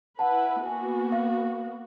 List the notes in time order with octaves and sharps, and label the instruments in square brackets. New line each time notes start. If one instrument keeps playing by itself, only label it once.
[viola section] E4 B4 [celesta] F#5 A5
[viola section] A#3 B3 F#4 [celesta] G#5
[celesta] F5